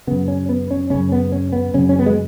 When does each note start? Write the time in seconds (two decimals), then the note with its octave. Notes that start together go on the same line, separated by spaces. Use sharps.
0.07 F#2 C#3 B3
0.28 C#4
0.49 B3
0.71 C#4
0.90 F#2 C#3 C#4
1.12 B3
1.32 C#4
1.53 B3
1.74 F#2 C#3 C#4
1.89 C#4
1.99 B3
2.06 G#3